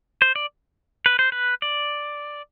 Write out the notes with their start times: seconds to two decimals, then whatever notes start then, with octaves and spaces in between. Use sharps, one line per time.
0.22 C5
0.36 D5
1.06 B4
1.19 C5
1.32 B4
1.62 D5